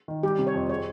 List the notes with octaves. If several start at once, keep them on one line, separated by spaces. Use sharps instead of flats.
D#3
G3 G4
C3
C#5
F2
G#4 C#5